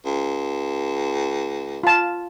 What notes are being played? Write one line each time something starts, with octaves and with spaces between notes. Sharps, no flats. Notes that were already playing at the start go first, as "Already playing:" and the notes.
C#2
F4 A5